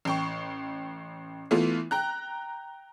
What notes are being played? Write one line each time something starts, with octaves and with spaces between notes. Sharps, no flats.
A1 G5 C#6
E3 A3 B3 E4 F4
G5 A#5 F#6